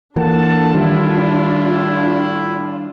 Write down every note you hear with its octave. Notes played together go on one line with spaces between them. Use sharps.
E3 A#3 D4 F4 A4 F#5 A5
A2 D#3 G3 E4